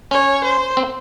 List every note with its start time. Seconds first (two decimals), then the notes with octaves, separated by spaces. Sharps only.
0.11 C#4 C#5
0.45 C5
0.77 C4